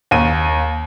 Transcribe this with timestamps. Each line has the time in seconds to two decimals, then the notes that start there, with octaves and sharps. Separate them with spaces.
0.11 D#2 D#7